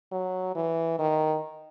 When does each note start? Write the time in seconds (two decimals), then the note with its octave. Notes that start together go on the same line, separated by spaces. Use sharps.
0.12 F#3
0.56 E3
0.99 D#3